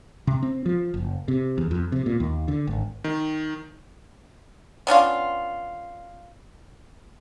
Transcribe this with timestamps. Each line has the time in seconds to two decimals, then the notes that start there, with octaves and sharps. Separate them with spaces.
0.27 C3
0.43 C4
0.66 F3
0.94 F#1
1.28 C3
1.58 E2
1.71 F2
1.92 C3
2.06 A#2
2.20 D#2
2.48 D3
2.67 G#1
3.04 D#3
4.87 B3 C#4 D4 F4